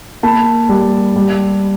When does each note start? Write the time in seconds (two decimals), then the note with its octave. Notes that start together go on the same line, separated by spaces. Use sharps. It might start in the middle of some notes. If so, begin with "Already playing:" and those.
0.23 A#3 A5 B5
0.69 G3
1.16 G3